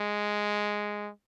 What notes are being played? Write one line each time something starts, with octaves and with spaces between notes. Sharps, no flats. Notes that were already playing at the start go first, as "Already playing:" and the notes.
Already playing: G#3